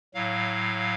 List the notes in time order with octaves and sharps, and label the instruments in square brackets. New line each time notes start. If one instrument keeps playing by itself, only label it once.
[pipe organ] A2 F#3 F5